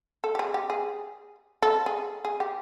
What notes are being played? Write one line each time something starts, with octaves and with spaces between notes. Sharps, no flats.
A4
G4
G#4
G4
G#4
A4
G#4
G#4
G4